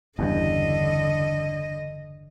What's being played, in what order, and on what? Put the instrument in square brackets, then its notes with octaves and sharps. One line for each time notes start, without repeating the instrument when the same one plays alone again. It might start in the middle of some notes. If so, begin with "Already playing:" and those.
[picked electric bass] F#1 E2 G2 [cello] D3 D#5